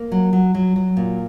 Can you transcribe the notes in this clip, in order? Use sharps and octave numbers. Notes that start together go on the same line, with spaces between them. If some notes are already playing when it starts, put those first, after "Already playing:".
Already playing: A#3
F#3
F#3
F#3
F#3
A#2